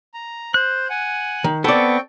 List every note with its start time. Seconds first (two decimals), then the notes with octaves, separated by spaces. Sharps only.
0.14 A#5
0.54 C5 F#6
0.90 F#5 G#5
1.44 D#3
1.64 B3 C4 A4 D5 G5 C#6